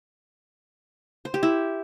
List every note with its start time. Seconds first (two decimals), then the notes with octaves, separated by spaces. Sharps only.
1.25 C5
1.34 G4
1.43 E4